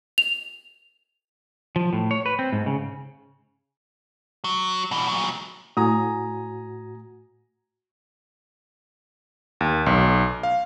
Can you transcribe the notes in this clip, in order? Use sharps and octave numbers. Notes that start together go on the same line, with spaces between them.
F7
F3
A2
C#5
B4
C4
G#2
C#3
F#3
B2 E3
A#2 F#3
A2 F#4 G#5 A#5 D#6
D#2
B1
F5